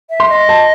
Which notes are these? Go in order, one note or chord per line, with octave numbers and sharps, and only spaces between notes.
E5
C6
D#5
A5